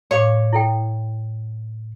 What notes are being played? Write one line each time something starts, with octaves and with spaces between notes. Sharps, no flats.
A2 C#5 F5 D6
E4 A4 G5